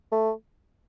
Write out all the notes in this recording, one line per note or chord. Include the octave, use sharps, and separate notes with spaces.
A3